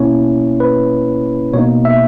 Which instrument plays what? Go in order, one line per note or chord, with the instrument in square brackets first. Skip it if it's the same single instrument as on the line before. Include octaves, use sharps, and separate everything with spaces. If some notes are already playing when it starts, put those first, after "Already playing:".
Already playing: [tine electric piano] B2 A#3 C#4 E4 C#5
B4
B2 C#5
A#3 D#4
E5